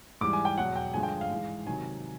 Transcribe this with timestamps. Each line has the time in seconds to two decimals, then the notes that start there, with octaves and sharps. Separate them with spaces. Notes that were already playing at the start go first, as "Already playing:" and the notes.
0.21 G#2 E3 G3 D6
0.33 G#5
0.45 G5
0.57 E2 B2 F#3 F#5
0.76 G5
0.94 G2 D3 F3 G#3 G#5
1.03 G5
1.21 F5
1.30 G#2 E3 G#3
1.67 C3 D#3 F#3 G#5